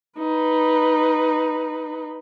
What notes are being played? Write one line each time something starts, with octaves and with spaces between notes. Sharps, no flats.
D#4 B4